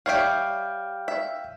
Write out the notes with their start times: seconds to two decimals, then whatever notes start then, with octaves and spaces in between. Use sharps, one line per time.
0.06 G3 C#5 E5 F5 G5
1.08 E5